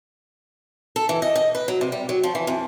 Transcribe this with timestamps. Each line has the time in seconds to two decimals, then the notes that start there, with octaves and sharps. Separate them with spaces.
0.96 A4
1.09 E3
1.22 D#5
1.36 D#5
1.55 B4
1.68 F#3
1.81 C3
1.92 G3
2.09 F#3
2.23 F3
2.35 E3
2.47 F2